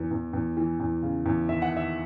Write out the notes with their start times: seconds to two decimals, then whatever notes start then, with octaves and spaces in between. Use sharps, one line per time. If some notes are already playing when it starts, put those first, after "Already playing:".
Already playing: E2 E3
0.11 E2
0.33 E2
0.57 E3
0.80 E2
1.03 C#3
1.26 E2
1.49 D#2 E5
1.62 F#5
1.71 D#3
1.77 E5